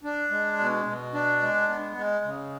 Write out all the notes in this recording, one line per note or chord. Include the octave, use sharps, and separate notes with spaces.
D4
G#3
B2
B2
D4
G#3
B3
G#3
C#3